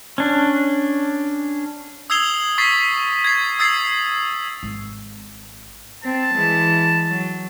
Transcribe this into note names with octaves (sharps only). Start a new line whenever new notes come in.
C#4 D4
D#6 E6 G#6 C7 F7 G7
C#6 D#6 A6 B6 C7
G#6 A6 C7
D#6 E6 G#6 A6 C7
G#1
C4 A5
E3 G#3
F#3